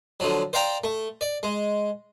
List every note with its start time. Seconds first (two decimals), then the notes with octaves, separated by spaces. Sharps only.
0.20 D3 F3 F#3
0.53 C5 D5 F5 G5 A#5
0.84 A3
1.21 D5
1.43 G#3